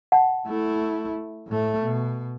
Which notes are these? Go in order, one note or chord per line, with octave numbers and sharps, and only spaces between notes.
F#5 A5
A3 E4
A2 A3
B2